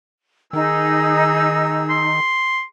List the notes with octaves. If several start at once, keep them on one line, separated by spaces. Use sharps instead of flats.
D#3 D#4 G#4 E6
C6